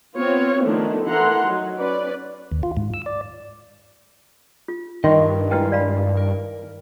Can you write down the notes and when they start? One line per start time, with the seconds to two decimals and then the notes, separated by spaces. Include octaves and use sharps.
0.16 B3 C4 F4 C#5
0.63 D#3 F3 A3 B3 D4
1.06 E3 A4 A#4 F#5 A#5 C6
1.45 F#3 D#4
1.77 C#4 B4 D5
2.52 D#2
2.63 F4
2.77 G#2
2.94 E6
3.06 D5
4.68 F4
5.04 G2 D#3 G4 A#4 D#5 C6 C#6
5.51 G#3 E4 F4 B4 G5
5.72 D5 F5 B5
6.17 A#4